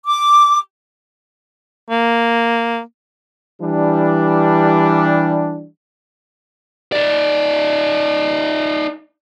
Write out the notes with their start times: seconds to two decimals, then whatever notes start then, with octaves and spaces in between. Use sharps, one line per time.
0.07 D6
1.90 A#3
3.62 E3 G3 D4
6.92 D#4 D5